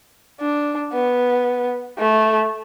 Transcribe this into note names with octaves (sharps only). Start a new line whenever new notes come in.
D4
B3
A3